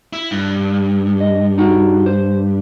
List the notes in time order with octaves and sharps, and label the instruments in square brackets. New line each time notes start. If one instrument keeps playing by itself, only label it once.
[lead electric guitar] E4
G2
[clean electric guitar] D#5
D#4 F#4 F#5
C5